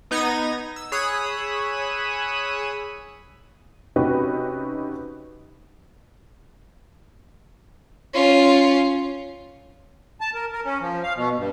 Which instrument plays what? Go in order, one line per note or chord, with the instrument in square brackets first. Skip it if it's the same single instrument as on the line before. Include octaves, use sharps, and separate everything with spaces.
[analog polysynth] B3 D#4 G#6 A#6 D#7
E6
G#4 C#5 B5 D#6 E6 F#6
[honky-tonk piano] C3 C#4 D#4 F#4 G4 B4
[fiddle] C#4 F4
[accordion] A5
A#4
A#4
C#4
F3
F5
B2
G2